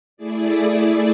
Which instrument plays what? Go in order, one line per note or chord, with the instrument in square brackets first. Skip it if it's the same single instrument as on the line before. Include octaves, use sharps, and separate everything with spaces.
[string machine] A3 E4 G#4 D5